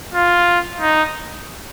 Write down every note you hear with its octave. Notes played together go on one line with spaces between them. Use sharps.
F4
D#4